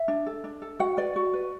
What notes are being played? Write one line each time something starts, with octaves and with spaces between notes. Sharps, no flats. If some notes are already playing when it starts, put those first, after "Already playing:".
Already playing: E5
D4
A4
D4
A4
F#4 F#5
B4 D5
F#4
B4